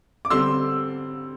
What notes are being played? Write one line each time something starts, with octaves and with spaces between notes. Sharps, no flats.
D6
D3 G3 C4 C6 E6